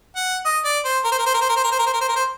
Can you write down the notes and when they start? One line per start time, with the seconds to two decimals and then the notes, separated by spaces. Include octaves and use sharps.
0.16 F#5
0.45 D#5
0.65 D5
0.85 C5
1.04 A#4
1.12 C5
1.18 A#4
1.26 C5
1.34 A#4
1.41 C5
1.49 A#4
1.56 C5
1.64 A#4
1.72 C5
1.79 A#4
1.86 C5
1.94 A#4
2.01 C5
2.09 A#4
2.16 C5